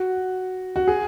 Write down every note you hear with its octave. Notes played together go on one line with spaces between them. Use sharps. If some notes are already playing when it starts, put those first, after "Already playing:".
Already playing: F#4
F#4
G#4